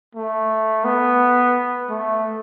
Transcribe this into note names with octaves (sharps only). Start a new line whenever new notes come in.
A3
B3
A3